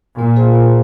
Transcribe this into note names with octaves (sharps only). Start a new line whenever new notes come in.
A#2 A#3
F4 G#4 C5 F5
A#3